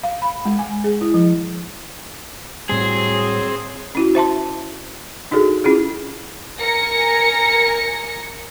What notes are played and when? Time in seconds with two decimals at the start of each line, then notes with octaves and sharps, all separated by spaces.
0.04 F5
0.22 B5
0.45 G#3
0.59 G#5
0.84 G#4
1.01 E4
1.14 F3
2.69 A2 F#3 G3 C4 G#4
3.95 C#4 E4 F#4
4.15 C5 E5 A5 C6
5.31 D4 D#4 F#4 G#4 A4
5.64 C#4 E4 F4 G#4
6.60 A#4 G#5 A#6 C#7